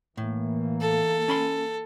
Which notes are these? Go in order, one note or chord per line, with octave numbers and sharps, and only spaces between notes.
A2 E3 A#3
A4
C#4 B5 C6